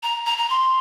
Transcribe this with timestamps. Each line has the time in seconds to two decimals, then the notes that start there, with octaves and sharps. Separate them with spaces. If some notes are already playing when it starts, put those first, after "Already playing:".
0.03 A#5
0.26 A#5
0.38 A#5
0.50 C6